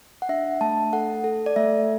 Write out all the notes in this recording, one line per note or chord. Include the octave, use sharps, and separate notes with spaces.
F#5
D4 E5
A3 A5
A4 F#5
A4
D5
A3 E5